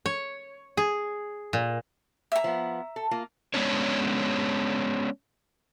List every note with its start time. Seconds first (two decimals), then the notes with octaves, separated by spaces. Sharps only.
0.06 C#5
0.77 G#4
1.53 A#2
2.32 E5 A#5
2.44 F3 B3
2.96 A4
3.11 A#3 F4
3.54 G#3 B3 C#4 D4 C#5